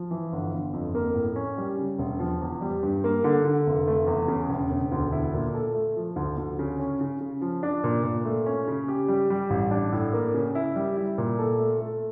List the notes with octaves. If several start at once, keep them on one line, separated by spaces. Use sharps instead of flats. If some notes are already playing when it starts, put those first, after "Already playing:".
Already playing: F3
E3
G1
G1
F2
A#3
A2
C#4
G3
C#3
E1
F3
E2
G3
G2
A#3
D3
D3
F1
A3
E2
C#3
E1
E1
D2
E4
A#2
A4
A3
F3
D2
D2
C#3
C#4
C#3
C#3
F3
D4
A#2
A#2
A3
C#4
C#3
G4
G3
G3
A1
D4
A2
A#3
C#3
E4
G3
E4
A#2
A4
A3
A3